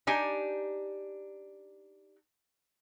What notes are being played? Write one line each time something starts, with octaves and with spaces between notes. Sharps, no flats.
D4 D#4 G4 G#5